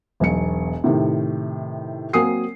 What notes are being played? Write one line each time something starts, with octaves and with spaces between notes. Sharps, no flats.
E1 B1 C#7
A2 C3 D#3
F#3 A#3 C4 G#5 D#6 C7